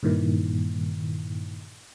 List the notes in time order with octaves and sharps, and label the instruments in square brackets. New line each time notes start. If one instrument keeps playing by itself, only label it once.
[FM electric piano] G2 A#2 D#3 E3